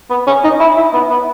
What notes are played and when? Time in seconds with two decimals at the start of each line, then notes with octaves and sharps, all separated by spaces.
0.10 B3
0.27 C#4
0.44 D#4
0.60 E4
0.77 E4
0.94 B3
1.10 B3